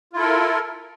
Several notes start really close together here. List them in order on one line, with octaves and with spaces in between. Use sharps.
F4 E4 A4 A#4